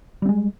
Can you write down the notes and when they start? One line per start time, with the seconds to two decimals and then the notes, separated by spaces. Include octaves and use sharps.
0.22 G3
0.25 C4
0.29 G#3